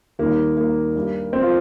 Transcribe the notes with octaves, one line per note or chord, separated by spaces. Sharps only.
D#2 D#3 G3 A#3
A#3
G2 G3
C4
F4